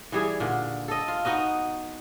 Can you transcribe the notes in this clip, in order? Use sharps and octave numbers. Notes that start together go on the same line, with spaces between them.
E3 G3 G#4
A#2 D3
A4 D#5
F4
B3 D#4 F#4 D#5